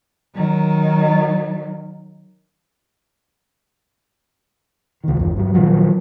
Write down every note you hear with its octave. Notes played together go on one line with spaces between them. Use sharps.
D#3 F#3
C#2 D#3
G1 E2
G2 F#3
A#2 D#3 F3 F#3